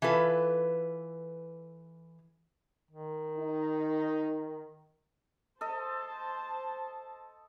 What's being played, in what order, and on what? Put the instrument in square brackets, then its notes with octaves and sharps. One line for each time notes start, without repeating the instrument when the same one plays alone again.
[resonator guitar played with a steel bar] E3 F4 A4 B4
[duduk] D#3
[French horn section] D#4
[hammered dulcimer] A4 D#5 [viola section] C5 A5